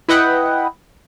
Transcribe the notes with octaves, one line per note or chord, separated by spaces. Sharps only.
E4 B4 D#5 F#5 G5 B5